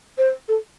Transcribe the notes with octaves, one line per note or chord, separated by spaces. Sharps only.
C5
A4